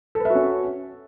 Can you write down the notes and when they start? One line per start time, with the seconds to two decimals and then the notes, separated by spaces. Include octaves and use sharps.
0.15 A4
0.20 B4
0.25 E5
0.30 F#4
0.35 C#4